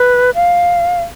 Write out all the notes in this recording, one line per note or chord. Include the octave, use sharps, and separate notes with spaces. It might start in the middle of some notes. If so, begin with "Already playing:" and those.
Already playing: B4
F5